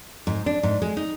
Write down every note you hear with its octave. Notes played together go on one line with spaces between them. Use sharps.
G#2
D4
G#2
G#3
D#4